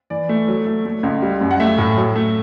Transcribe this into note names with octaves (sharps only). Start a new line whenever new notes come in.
E3 D5
A3
F#3
A3
A3
C#2
G3
F#2
F#5
A3 E5
A2
F#3
A3